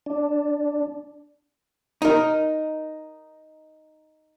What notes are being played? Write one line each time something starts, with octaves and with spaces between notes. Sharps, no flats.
D4
D#4 A#4